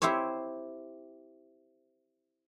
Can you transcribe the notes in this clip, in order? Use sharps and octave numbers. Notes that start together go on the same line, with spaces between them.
C4 E4 G4 C5 C#5